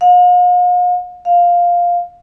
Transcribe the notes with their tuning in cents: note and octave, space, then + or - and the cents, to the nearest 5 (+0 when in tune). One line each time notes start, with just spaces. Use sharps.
F5 +45
F5 +5